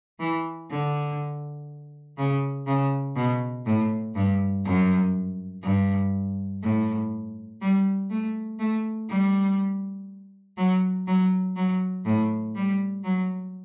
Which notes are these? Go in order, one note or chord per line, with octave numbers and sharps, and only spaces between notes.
E3
D3
C#3
C#3
B2
A2
G2
F#2
G2
A2
G3
A3
A3
G3
F#3
F#3
F#3
A2
G3
F#3